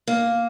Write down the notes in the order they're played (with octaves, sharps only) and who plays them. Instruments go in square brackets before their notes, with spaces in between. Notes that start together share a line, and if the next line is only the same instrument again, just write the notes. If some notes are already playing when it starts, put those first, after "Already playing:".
[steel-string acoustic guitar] A#3